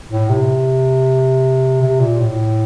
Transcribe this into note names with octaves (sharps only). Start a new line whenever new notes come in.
A2
C3
C3
A#2
A2